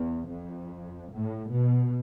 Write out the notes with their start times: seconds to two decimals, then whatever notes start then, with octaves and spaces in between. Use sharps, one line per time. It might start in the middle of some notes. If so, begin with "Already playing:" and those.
Already playing: E2
0.29 F2
1.12 A2
1.52 B2